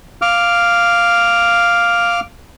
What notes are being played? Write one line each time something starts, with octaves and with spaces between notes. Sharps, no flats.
F5 D6 F6